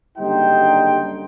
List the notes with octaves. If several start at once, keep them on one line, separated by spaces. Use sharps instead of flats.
F#1 D3 G3 D#4 C5 G5